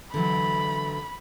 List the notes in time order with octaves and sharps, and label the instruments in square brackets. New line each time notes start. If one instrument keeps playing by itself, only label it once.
[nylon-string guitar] D3 E3 F#3 [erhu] B5